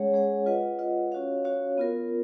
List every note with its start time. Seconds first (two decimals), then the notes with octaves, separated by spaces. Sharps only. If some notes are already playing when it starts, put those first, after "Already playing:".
Already playing: G#3 C#4 G#4 C#5 F#5
0.13 G#3 C#4 G#4 C#5 F#5
0.46 F4 B4 D#5 F#5
0.79 F4 B4 D#5 F#5
1.12 C#4 F#4 C#5 F5
1.45 C#4 F#4 C#5 F5
1.78 B3 F4 A#4